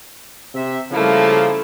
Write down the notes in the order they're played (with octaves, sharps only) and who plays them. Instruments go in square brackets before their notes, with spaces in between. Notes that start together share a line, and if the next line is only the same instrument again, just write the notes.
[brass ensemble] C3 E5
[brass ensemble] C#3 F3 A#3 [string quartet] G3 A3 E4